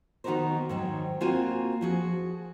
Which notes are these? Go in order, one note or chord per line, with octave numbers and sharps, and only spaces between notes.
D#3 B3 D#4 F#4 A#4 C5
G#2 D#3 F#3
A#3 C4 F4 F#4 G#5
F3 F#4 G#4